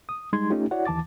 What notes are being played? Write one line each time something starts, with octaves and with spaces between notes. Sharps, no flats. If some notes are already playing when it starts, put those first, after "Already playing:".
D#6
G3 G#3 D#4 C6 G#6
A3 C#4 D#4 F4 G4
E4 F#4 C#5 D5 F#5
D#2 E3 A5 D6 A6